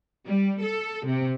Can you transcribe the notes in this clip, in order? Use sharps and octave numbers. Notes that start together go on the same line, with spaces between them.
G3
A4
C3